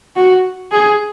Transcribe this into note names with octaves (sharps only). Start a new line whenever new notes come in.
F#4
G#4